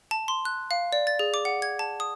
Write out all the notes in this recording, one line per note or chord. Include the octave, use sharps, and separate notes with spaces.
A5
C6
F#6
F5
D5
A6
G#4
D6
F#5
G#6
A5
D#6